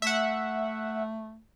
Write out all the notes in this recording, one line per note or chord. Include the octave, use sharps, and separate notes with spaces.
A3 E5 F#5